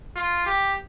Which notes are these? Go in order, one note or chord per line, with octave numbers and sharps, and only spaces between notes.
F4
G4